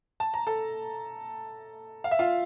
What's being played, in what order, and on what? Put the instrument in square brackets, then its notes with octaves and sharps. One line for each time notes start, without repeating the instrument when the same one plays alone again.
[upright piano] A5
A#5
A4 A5
F5
E5
F4 F5